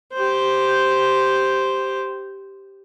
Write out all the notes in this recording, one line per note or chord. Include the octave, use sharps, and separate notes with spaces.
G4 C5